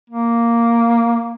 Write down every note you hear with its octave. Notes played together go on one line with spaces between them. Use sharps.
A#3